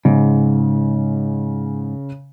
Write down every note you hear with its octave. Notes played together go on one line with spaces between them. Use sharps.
G#2 C#3